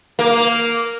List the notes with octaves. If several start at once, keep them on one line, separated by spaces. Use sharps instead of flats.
A#3